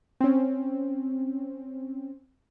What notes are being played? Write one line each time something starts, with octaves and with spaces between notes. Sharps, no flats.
C4 C#4